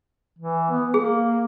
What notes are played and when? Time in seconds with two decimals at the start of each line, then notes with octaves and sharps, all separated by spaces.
0.39 E3
0.70 B3
0.94 A#3 G#4